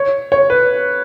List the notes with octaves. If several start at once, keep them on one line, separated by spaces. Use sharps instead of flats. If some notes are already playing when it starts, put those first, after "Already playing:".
Already playing: C#5
C#5
B4